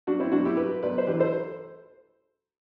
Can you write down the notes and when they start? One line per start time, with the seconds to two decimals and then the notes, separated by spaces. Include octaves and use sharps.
0.07 F#3 D4 F#4
0.20 C4 E4
0.32 B1 D4 F#4
0.45 E4 G4
0.57 F#3 G4 B4
0.83 B1 B4 D5
0.98 C5
1.07 E3 G4 B4
1.19 A4 C5